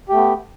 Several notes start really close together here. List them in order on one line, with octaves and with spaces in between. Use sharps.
G4 A3 B3